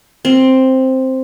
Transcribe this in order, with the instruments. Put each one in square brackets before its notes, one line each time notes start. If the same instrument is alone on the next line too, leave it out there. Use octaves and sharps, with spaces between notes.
[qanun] C4